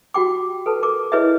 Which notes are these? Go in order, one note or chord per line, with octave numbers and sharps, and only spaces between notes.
F#4 G4 G5 D6
A4 B4 A5
A#4 D6
E4 G#4 B4 C#5 D#5 E5